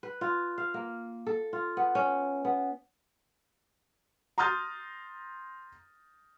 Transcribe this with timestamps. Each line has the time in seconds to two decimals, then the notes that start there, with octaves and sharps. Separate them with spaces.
0.03 B4
0.21 F4
0.58 F5
0.74 A#3
1.27 A4
1.53 F4
1.77 B3
1.95 C#4
2.45 B3
4.38 A#5 C6 D#6 F6 G6 A6